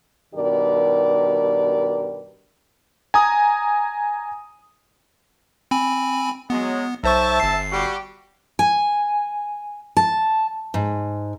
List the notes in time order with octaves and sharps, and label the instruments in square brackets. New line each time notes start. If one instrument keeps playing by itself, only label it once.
[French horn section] G2 B2 D#3 G4 A#4 D5
[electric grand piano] G#5 A#5 D#6
[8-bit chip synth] C4 G#5 B5
[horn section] F#3 G#3 [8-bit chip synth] B3
[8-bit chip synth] B1 C5 C#6 [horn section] E5 A5
[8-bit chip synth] G1 C7
[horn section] G3 F#4 G4
[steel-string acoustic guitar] G#5
A5
G#2